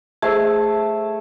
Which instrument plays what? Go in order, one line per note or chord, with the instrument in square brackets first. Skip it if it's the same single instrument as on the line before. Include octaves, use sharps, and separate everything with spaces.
[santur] A3 [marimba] G#4 C5 E6